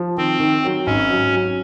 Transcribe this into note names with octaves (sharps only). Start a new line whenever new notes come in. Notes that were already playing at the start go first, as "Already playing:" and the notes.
Already playing: F3
D#3 C4
D#3
F#3
G#1 C#4
F#3
F#3